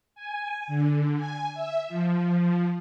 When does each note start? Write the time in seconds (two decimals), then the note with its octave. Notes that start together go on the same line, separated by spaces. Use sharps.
0.15 G#5
0.67 D3
1.17 G#5
1.54 E5
1.88 F3